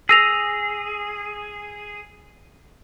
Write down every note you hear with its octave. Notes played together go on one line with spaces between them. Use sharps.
G#4 E6 A#6 F7